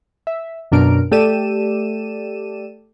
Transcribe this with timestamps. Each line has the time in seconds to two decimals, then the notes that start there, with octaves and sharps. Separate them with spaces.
0.27 E5
0.72 F#2 B2 D4 A#4 F6 D7
1.11 A3 G4 A4 D5 D#7 E7